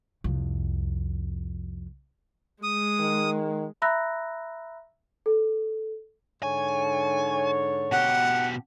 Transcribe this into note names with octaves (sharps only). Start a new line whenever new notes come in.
C2 F2
G#3 D#6
D#3
E5 A#5 B5 E6 F#6 A#6
A4
G#2 D3 C#5 G#5
B2 G4 F#5